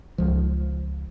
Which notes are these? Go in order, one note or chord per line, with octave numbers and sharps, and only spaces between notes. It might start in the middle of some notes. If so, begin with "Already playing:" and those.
C#2 F3